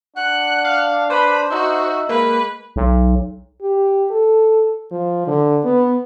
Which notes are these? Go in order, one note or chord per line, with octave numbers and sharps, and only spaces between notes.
D4 F#5 F#6
F5
B4 C5 B5
D#4 F#4 E5
G#3 A#3 B4
B1
G4
A4
F3
D3
B3